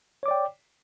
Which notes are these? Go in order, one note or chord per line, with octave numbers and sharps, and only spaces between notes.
C#5 D5 G5 D6